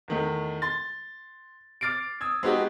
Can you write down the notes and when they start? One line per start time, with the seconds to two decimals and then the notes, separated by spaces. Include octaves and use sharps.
0.08 E2 D#3 A3
0.62 C6 A6
1.81 D6 F6 A6 C7 D7
2.21 D#6 E6 G#6
2.43 G#3 B3 D#4 F#4 G4